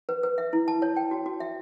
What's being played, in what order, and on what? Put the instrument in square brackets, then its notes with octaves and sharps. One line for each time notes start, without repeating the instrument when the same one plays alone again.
[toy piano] B4
B4
E5
E4
A5
C#5
G5
F#4
F#4
E5